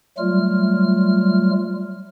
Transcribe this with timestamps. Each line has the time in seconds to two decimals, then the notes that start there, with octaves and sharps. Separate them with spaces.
0.18 F#3 G3 A3 F4 F6